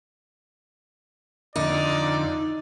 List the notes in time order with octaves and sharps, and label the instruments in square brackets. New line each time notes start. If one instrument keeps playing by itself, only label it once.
[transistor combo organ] F2 D3 [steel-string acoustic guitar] D#4 [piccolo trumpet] D5